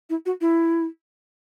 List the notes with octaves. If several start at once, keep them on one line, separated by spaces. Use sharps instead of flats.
E4
F#4
E4